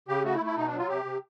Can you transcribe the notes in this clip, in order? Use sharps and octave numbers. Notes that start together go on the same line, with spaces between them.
C#3 G4
A3 F#4
E4
A3
E4
B2 D#4
D4
F#3
F4
C3 G4
C3